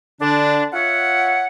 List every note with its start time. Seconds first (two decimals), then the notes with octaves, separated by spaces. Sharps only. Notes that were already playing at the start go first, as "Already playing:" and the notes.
0.20 D3 D4
0.73 F4 C#5 E5 F#5